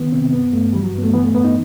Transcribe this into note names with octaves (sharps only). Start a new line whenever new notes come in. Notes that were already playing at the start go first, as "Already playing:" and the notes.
Already playing: D#3 B3
C3 C4
G2 B3
G2 A3
E3 G3
F#3
G2 B3
A3
E3 B3
A3
A2 B3
D#4